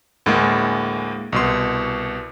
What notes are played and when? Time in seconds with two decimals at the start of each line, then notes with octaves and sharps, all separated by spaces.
0.26 D2 A2 G#3 A#3
1.32 C2 B2 C6